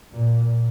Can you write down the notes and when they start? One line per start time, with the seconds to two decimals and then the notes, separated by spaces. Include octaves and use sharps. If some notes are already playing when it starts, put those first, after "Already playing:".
0.11 A#2